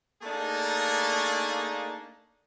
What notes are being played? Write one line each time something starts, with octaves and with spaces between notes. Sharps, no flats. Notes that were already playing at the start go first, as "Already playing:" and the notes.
A3 A#3 D4 D#4 G#4